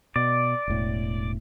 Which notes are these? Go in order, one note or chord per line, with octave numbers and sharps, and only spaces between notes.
B2 D5
E1 A2